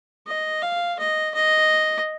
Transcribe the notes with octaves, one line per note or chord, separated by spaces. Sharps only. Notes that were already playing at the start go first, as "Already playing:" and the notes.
D#5
F5
D#5
D#5